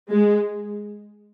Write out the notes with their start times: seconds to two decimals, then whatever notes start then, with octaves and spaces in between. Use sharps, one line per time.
0.11 G#3